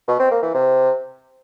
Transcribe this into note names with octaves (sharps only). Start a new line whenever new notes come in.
B2
C4
A#3
E3
C3